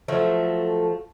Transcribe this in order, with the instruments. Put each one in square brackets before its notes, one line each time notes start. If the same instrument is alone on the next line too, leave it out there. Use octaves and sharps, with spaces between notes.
[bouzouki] F3 F#3 A3